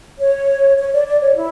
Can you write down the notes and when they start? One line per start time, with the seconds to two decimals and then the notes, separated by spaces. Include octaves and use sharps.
0.20 C#5
0.78 C#5
0.92 D5
1.07 D5
1.21 C#5
1.35 E4